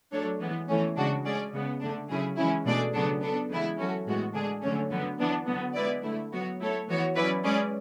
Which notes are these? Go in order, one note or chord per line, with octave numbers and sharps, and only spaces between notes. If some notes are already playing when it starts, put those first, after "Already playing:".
F#3 A3 D4 A4 C#5
E3 G#3 B3
E3 A3 C#4
C#3 G#3 D4 F#4
G#3 C#4 G#4 D5
C#3 G#3 B3
D3 A3 D4
C#3 F#3 C#4 E4 G#4
E3 G#3 C#4 E4
B2 A3 D4 G#4 D5
C#3 F#3 B3 D4 A4
B3 D4 A4
C#3 E3 G#3 B3 E4
F#3 C#4 F#4 A4
A2 E3 G#3 B3 F#4
D3 G#3 D4 G#4
D3 F#3 A3 C#4
D3 F#3 B3
E3 B3 D4
D3 F#3 B3
G#3 B3 E4 B4 D5
D3 A3 E4
F#3 B3 F#4 C#5
A3 E4 A4 C#5
E3 B3 F#4 C#5
F#3 C#4 E4 B4 D5
G#3 C#4 G#4 B4 D5